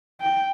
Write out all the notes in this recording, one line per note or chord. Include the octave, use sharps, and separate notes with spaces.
G5